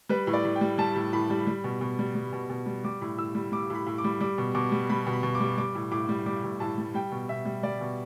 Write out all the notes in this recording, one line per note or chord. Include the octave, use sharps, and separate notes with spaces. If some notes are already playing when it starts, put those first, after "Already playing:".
G3 B4
A2
D5
A2
G5
G3
G3 A5
A2
A2 B5
G3
G3
B2
B2
G3
G3
B2
B2
G3
G3 D6
A2
A2 E6
G3
G3 D6
A2 B5
A2
D6
G3
G3 D6
B2
B2 D6
G3
G3 B5
B2
B5
B2
D6
G3
G3 D6
A2
A2 D6
G3
G3 D6
A2
A2 A5
G3
G3 G5
B2
B2 E5
G3
G3 D5
B2